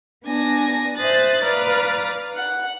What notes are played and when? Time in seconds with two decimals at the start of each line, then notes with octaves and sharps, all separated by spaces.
0.25 B3 D4 G#5 A#6
0.97 C5 E5 D#6 F#6 A6
1.43 B4 D5 F5 A#5
2.35 F#5